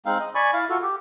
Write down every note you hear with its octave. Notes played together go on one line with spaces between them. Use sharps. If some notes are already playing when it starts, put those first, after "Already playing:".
G#3 C4 D#4 F5
D#5
D5 G#5 B5 C#6
E4 F5
F4 F#4 A4
G4